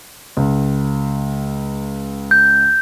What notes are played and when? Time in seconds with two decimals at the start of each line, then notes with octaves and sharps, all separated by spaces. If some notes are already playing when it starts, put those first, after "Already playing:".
0.37 C#2
2.31 G6